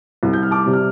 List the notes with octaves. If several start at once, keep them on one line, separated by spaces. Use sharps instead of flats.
C2
G6
F6
A5 D6
C3 G3
F6